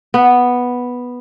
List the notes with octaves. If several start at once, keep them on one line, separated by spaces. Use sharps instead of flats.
B3